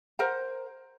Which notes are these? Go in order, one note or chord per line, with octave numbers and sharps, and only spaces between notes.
A#4 C5 F#5 A#5